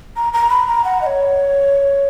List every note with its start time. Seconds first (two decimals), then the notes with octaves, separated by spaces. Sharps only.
0.16 A#5
0.33 A#5
0.50 B5
0.67 A#5
0.85 F#5
1.01 D#5
1.06 C#5